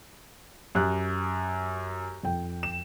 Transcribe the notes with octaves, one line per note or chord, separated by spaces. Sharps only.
F#2 G4 F#6
F2 G5
E7